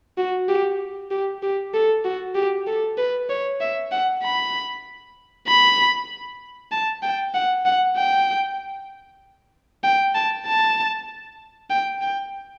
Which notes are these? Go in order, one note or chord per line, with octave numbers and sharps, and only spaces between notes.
F#4
G4
G4
G4
A4
F#4
G4
A4
B4
C#5
E5
F#5
B5
B5
A5
G5
F#5
F#5
G5
G5
A5
A5
G5
G5